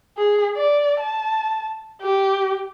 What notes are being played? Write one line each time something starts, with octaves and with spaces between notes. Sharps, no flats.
G#4
D5
A5
G4